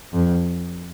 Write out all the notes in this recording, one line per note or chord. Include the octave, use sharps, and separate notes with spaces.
F2